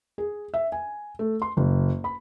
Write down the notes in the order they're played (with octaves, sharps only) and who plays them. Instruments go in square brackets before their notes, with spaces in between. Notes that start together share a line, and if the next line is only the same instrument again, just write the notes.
[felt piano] G#4
E5
G#5
A3
C6
F#1
B5